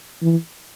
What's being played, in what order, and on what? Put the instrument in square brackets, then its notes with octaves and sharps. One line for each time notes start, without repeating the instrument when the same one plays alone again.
[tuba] E3